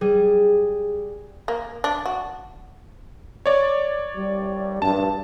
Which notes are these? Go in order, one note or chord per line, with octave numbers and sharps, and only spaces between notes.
G3 G#4
A#3
D4
F#4
C#5 D5
G3
G2 A5